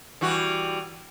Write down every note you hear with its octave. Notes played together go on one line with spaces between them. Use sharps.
E3 G3 F#4